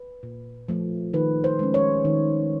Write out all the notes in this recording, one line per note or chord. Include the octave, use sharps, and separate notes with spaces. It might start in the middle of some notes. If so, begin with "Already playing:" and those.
Already playing: B4
A#2
F3 A3
D#3 B4
C5
G#3 C#4
C#5
D#3